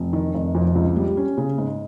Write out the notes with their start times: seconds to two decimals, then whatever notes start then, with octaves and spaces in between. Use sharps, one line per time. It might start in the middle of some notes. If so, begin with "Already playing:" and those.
Already playing: F1
0.13 D#3
0.34 F1
0.55 F2
0.75 C#2
0.96 G3
1.17 C#4
1.38 C#3
1.58 G#2